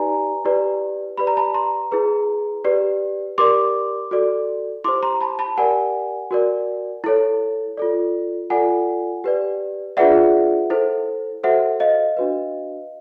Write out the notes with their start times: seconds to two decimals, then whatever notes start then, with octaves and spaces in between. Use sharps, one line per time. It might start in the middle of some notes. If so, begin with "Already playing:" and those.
Already playing: D#4 G4 B4 D5 G#5 A#5
0.45 E4 G4 B4 D5
1.17 G4 B4 D5 B5
1.27 A#5
1.37 A5 B5
1.54 A#5 C6
1.92 E4 G#4 B4
2.65 G4 B4 D5
3.38 G4 A#4 D5 C6 D6
4.11 F#4 A4 D5
4.84 E4 G4 C5 C6 D6
5.03 A#5 C6
5.21 A5 B5
5.39 A5 B5
5.57 G4 A#4 D5 F#5 G#5
6.31 F#4 A#4 D5
7.04 E4 A4 C#5
7.77 F4 A4 D5
8.50 F4 A4 D5 F#5 G#5
9.24 G4 B4 D5
9.97 D4 F4 G#4 B4 D5 E5 F#5
10.70 E4 A4 C5
11.44 F#4 A4 C5 E5 F#5
11.80 D#5 F5
12.17 D4 F#4 B4